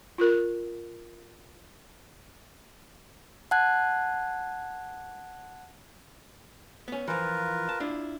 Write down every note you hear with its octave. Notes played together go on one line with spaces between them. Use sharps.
F4 A#4
F#5 A5 F#6 G#6
B3 C#4
E3 F3 F4 A#4 B4
A5
D4 E4 F4